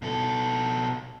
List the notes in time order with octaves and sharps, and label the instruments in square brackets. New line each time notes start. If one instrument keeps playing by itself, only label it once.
[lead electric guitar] B2 A4